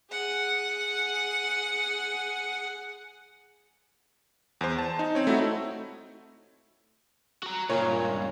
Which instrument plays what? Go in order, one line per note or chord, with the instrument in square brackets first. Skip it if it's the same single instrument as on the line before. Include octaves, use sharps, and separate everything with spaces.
[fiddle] G#4 F#5
[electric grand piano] E2 C5
A5
D#4
C4 C#5
A3 D#4 E4 F#4
[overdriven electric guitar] F#4 A#5
[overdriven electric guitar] C#2 G2 [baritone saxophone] A#2 [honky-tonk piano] C#5